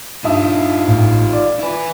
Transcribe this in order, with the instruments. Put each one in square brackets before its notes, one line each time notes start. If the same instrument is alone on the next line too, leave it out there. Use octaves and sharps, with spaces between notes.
[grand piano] G2 E5 D#6 [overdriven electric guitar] D#4 F4
[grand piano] A1
D5
[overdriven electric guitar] E4 B4